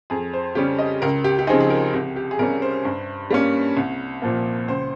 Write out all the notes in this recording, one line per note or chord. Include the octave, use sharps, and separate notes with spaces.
F2 G#4
C5
C#3 G3 C#4 G4
D#5
C#2 A#4
G4
G4
C#3 F3 C4 D#4 G#4
G#4
A#4
C2 G4
G4
G#4
C3 G3 C#4 A#4
C5
G2
G3 A#3 C#4
C2
A#2 F3 A#3
C#2 C5